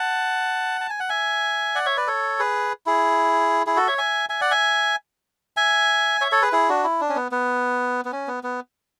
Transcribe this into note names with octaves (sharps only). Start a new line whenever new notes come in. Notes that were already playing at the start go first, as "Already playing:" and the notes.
Already playing: F#5 A5
A5
G#5
F#5
E5 G#5
D5 F#5
C#5 E5
B4 D5
A4 C#5
G#4 B4
E4 G#4
E4 G#4
F#4 A4
C#5 E5
E5 G#5
E5 G#5
D5 F#5
E5 G#5
E5 G#5
C#5 E5
A4 C#5
G#4 B4
E4 G#4
D4 F#4
E4
D4
C#4
B3
B3
B3
C#4
B3
B3